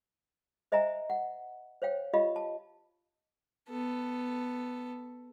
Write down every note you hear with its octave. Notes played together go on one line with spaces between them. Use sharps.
C5 D#5 E5 G#5 A#5
F#5
C5 C#5 F5 G5
F4 G4 D#5 F5 B5
A5
B3 A4